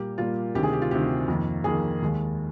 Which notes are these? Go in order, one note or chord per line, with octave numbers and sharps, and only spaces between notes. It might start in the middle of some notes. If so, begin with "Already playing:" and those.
Already playing: A#2 G3 A#3 G4
A#2 G3 A#3 F4
D2 C3 D#3 G4
G#4
G4
F4
D2 C3 D#3 G4
F2 D#3 A#3
F2 D#3 A#3 G#4
D#2 D#3 G#3